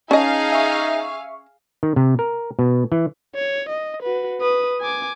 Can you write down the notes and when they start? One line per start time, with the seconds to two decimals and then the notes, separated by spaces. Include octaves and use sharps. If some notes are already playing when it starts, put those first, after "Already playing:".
0.11 C#4 D#4 G#4 D#5 F5 A5
0.52 E5 C#6
1.83 D#3
1.96 C3
2.19 A#4
2.59 B2
2.92 E3
3.35 C#5
3.69 D#5
4.02 F#4 B4
4.41 B4 D#6
4.81 G#5 D6